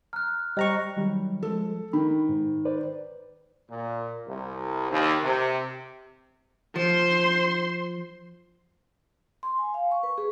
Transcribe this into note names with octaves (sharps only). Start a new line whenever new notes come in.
A#5 F6 F#6
G3 C5 D#5 G5 A#5 C#6
D#3 F#3 G3
F3 G#3 A4
D#3 B5
G#2
B4 C5 D5
A#2
C2
D#2
C3
F3 C5 C6
C6
G#5
F5
C#6
B4
G#4